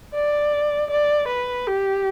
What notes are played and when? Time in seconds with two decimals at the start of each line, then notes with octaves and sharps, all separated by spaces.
0.14 D5
0.91 D5
1.28 B4
1.67 G4